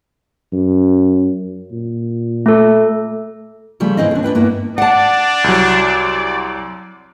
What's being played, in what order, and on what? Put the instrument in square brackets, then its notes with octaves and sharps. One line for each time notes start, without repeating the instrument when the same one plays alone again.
[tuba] F#2
A#2
[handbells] A3 A4
[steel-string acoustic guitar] C#3 F3 G3 A3
D#2 G#2 E3 C4 E4 D#5
D#2 D4
D4 E4 B4 G5
G2 A#3 B3 E4
[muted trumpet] D4 [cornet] D5 [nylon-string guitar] F#5 A5
[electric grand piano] C2 F#3